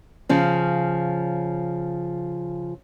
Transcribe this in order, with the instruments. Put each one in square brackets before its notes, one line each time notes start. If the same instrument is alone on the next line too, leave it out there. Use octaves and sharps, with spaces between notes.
[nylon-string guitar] C#3 F3 C#4